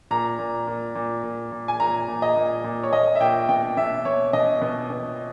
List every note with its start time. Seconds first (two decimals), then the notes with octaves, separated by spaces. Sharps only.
0.11 A#2 A#5
0.39 A#2
0.67 A#2
0.95 A#2
1.24 A#2
1.52 A#2
1.68 G#5
1.80 A#2 A#5
2.08 A#2
2.22 D#5
2.36 A#2
2.64 A#2
2.83 C#5
2.93 A#2 D#5
3.15 E5
3.20 A#2 G5
3.49 B2 G5
3.77 B2 E5
4.05 B2 C#5
4.33 B2 D#5
4.62 B2
4.90 B2